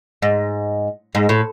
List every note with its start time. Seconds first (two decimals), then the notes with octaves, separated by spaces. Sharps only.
0.22 G#2
1.15 G#2
1.29 A2